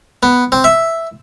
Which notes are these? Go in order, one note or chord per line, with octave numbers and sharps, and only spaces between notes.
B3
C4
E5